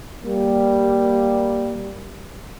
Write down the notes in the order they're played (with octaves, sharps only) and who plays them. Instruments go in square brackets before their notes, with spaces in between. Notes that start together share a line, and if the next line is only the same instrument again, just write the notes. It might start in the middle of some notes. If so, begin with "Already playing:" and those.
[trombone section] G3 A#3